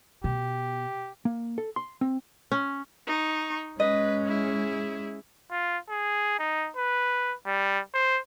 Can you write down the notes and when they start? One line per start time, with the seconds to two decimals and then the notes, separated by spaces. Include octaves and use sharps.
0.24 B2 G4
1.25 A#3
1.58 A4
1.76 C6
2.01 C4
2.52 C#4
3.07 D#4 C#6
3.80 G#3 C#4 B4 D#5
4.26 E4 G#4
5.51 F4
5.89 G#4
6.39 D#4
6.77 B4
7.46 G3
7.94 C5